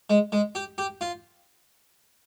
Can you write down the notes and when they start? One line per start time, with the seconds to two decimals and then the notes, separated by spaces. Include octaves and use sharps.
0.10 G#3
0.32 G#3
0.55 G4
0.78 G4
1.01 F4